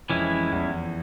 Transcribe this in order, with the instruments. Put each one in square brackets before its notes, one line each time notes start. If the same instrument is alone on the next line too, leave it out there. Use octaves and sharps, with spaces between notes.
[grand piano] F2 [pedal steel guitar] E3 G#3 C#4 E4
[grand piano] E2